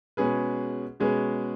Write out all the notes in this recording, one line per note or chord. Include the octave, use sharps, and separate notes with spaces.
B2 G#3 C#4 G#4 B4
B2 G#3 C#4 G#4 B4